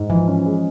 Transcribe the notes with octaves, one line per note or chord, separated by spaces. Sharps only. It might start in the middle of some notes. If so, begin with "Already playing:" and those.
Already playing: G#2
E3 F3
C#4
G#3